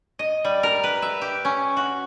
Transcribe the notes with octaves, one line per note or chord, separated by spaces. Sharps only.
D#5
G3
A#4
B4
E5
G4
C#4
F#4